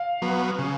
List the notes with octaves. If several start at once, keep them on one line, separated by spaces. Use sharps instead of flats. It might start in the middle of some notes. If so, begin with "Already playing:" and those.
Already playing: F5
F#3 B3
C#3